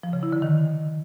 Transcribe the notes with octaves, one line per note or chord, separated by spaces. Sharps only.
F3
C#3
E4
D3
D#3